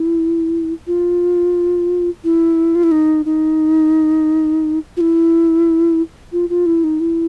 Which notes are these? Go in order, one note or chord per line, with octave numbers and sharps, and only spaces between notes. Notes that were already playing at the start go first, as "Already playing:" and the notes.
Already playing: E4
F4
E4
F4
E4
D#4
D#4
F4
E4
F4
F4
E4
D#4
E4